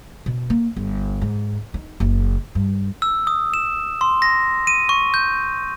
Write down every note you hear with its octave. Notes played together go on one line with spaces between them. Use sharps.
B2
A#3
G1
G#2
D#4
F#1
G2
E6
D#6
E7
C6
A#6
D#7
C#6
G6